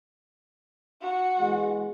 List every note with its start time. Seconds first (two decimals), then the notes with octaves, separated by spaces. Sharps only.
1.01 F#4 F#5
1.39 E2 G#3